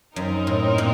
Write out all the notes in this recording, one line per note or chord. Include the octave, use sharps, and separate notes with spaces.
F#2 C4 D#4 A#4
A2
A#2